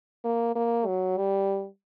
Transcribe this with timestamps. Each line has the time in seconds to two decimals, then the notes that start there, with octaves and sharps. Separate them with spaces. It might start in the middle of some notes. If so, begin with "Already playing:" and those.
0.24 A#3
0.55 A#3
0.86 F#3
1.17 G3